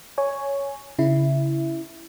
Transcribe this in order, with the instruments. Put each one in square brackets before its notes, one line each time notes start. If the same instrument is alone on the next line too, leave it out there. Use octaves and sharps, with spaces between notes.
[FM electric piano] C#5 G#5
C#3 E4